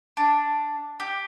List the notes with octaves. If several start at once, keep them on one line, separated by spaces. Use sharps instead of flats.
D4
G4